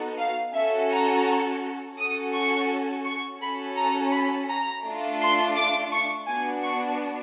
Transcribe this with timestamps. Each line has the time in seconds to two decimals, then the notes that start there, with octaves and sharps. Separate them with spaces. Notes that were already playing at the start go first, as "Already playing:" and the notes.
Already playing: B3 D#4 F#4 A4
0.18 F5
0.54 C#4 F#4 A4 E5
0.90 A#5
1.97 C#4 F#4 A4 D#6
2.33 C#6
3.06 C#6
3.41 C#4 F#4 A4 B5
3.77 A#5
4.12 B5
4.49 A#5
4.84 A3 D4 F4
5.21 C6
5.56 D6
5.92 C#6
6.28 B3 D4 F#4 G#5
6.64 C#6